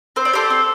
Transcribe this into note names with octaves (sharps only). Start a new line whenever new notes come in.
C4 C5
D5
G4 A4 C5
C4